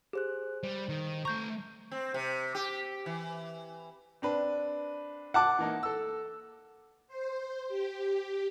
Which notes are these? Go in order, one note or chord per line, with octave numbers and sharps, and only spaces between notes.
G4 G#4 C5 F#6
G3 C5
D#3
A3 A#5 C#6 G6
C4
C3
G4
E3
C4 D4 B4
F#5 A5 D6
E3 A#3 D#4
A4 E6
C5
G4